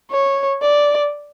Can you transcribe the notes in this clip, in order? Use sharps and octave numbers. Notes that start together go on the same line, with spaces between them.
C#5
D5